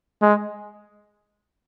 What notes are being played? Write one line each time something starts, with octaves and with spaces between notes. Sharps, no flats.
G#3